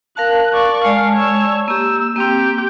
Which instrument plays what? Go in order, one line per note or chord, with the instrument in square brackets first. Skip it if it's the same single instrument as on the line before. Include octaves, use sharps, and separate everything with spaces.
[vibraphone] A#4 F5 A5 [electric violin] F#6
[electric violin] D5 C#6
[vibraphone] G#3 D5 A5 [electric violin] F5
[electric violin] C#5 E6
[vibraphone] A#3 G4 [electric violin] E6
[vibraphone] A#3 C4 [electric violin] G4 G5